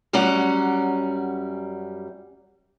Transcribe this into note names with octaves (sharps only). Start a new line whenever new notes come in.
F#2 G3 C#4 D5 F#5 A#5